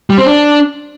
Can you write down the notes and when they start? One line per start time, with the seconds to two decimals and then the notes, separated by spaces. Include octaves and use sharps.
0.10 G3
0.18 C4
0.26 D4